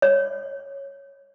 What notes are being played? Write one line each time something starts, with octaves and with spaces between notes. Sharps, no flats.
C#5